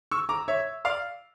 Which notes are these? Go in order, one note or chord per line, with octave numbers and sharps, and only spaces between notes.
C#6 E6
A#5 D6
C#5 E5
D5 F5